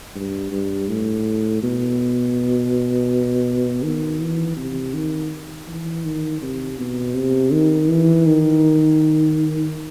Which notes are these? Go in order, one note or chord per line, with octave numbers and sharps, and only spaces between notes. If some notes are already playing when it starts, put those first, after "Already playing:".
G2
G2
A2
B2
D#3
E3
C3
D#3
E3
D#3
C3
B2
C3
D#3
E3
D#3